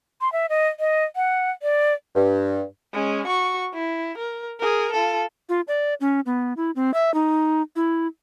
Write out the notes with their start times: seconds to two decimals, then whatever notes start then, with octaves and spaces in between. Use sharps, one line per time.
0.21 C6
0.33 E5
0.50 D#5
0.80 D#5
1.16 F#5
1.63 D5
2.15 G2
2.93 G#3 C#4
3.27 F#4 C#6
3.74 E4
4.18 A#4
4.60 G#4 A#4
4.93 F4 A4
5.49 F4
5.68 D5
6.01 C#4
6.26 B3
6.57 E4
6.76 C4
6.94 E5
7.14 D#4
7.76 E4